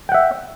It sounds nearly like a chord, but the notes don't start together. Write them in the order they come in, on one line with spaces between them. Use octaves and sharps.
G5 F#5 E5